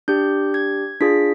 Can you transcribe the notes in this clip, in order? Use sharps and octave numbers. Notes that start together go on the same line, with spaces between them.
D4 G4 G6
G#6
D4 F4 G#4 B6